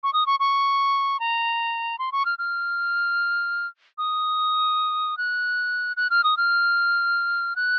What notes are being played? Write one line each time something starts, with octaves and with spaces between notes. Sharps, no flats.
C#6
D#6
C#6
C#6
A#5
C6
C#6
F6
F6
D#6
F#6
F#6
F6
D#6
F6
F#6